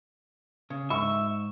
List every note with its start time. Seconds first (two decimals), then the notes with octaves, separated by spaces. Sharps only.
0.70 C#3
0.90 G#2 E5 C#6